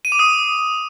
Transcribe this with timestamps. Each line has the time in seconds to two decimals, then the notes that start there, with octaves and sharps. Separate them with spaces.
0.05 D#7
0.12 D6
0.19 D#6